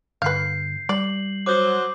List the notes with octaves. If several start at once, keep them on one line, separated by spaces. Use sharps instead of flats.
G2 D3 B4 F5 G6 C7
G3 D5 F#7
F#3 C5 D6 D#6